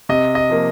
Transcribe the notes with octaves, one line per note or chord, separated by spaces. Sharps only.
C3 D#5
D#5
F3 A#3